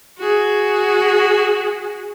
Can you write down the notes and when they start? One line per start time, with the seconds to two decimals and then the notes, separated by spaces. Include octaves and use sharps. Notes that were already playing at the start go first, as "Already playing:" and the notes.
0.19 F#4 G#4